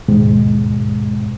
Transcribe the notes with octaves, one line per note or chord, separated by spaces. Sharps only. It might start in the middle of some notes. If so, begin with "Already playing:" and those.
D#2 G#2 B2 G#3